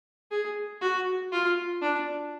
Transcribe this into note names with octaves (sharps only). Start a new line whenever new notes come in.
G#4
F#4
F4
D4